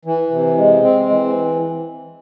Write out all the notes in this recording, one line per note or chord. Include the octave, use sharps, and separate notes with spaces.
E3
C3
G#3
C4
E3